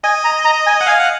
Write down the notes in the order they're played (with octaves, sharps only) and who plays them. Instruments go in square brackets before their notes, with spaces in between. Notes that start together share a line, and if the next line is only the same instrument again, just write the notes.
[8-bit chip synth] D#5 [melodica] G#5
[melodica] A#5
A#5
G#5
[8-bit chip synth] F#5
[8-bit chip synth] F5 [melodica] G#5
[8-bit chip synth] F#5